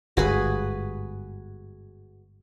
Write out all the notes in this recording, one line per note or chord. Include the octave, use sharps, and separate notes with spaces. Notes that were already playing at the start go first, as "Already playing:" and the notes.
G1 G#2 F#4 G#4 B4